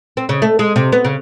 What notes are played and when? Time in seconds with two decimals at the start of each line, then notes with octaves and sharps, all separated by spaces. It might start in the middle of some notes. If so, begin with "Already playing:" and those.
0.17 C4
0.29 C#3
0.42 A3
0.59 G#3
0.76 C3
0.92 B3
1.05 C#3